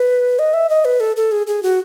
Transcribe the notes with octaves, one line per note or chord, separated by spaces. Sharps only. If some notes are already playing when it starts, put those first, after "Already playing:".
Already playing: B4
D#5
E5
D#5
B4
A4
A4
G#4
G#4
F#4